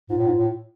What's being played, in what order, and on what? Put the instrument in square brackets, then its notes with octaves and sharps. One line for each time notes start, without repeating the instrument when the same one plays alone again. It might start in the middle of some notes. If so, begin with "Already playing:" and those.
[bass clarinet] G#2 [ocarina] F4
[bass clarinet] A2
G#2
A2